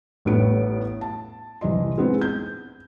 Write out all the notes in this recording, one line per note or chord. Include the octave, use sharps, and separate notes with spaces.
A1 A2 G3 A3 B3 D7
A5
C2 E3 G3 D#5 C6
G#3 B3 C4 E4
G6